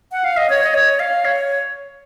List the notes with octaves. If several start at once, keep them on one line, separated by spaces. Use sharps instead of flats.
F#5
F5
D#5
C#5
D#5
C#5
F5
C#5